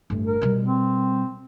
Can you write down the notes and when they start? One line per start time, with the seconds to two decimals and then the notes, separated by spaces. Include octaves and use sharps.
0.10 G1 A2
0.25 A#4
0.41 B2 G3
0.62 C4